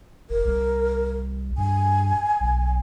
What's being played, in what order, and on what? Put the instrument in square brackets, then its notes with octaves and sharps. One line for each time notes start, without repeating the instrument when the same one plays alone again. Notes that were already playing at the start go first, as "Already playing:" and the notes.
[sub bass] F1 [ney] A#4
[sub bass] C2
[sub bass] G2 [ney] G#5
[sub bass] B1